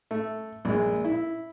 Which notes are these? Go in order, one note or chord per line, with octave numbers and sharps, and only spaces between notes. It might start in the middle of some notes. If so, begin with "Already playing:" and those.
A3
A#1 G#3
E4